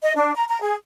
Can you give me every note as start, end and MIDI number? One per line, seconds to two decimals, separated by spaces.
0.02 0.13 75
0.16 0.34 62
0.35 0.44 82
0.48 0.61 82
0.61 0.75 68